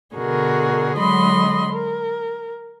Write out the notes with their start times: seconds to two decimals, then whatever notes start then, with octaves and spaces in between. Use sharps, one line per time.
0.15 B2 D3 F#4 G#4 A#4
0.98 D3 F#3 G#3 D#5 B5 C6
1.73 A#4